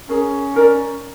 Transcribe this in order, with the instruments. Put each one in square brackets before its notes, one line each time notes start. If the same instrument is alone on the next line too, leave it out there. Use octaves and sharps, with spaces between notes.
[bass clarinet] C#4 [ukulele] G#4 A#4
[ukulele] D#4 A#4 D5